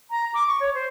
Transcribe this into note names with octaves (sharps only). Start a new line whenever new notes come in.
A#5
D6
C#6
C#5
C5